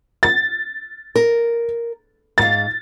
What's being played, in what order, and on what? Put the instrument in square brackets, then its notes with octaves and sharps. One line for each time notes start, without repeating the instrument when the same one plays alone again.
[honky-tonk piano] A6
[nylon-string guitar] A#4
[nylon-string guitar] G#2 F5 [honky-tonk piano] A6